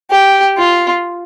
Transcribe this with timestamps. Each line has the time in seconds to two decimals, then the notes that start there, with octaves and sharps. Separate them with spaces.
0.11 G4
0.57 F4